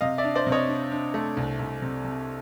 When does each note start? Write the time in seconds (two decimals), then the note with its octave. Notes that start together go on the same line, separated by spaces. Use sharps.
0.01 C3 D#5 F5
0.18 D5 E5
0.24 D4
0.35 C5 D5
0.47 C3
0.52 C#5 D#5
0.69 D4
0.92 D4
1.14 A3
1.37 C2
1.59 C2
1.82 C3
2.04 C3